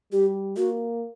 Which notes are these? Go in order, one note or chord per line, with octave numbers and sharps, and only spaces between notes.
G3 G4
A#3 F#4